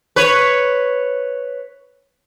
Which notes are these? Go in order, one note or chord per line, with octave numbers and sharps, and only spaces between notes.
B4 C#5